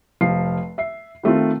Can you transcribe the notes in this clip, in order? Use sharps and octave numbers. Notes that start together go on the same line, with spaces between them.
F1 F3 F5 C7
E5 C7
D#3 A3 C4 F4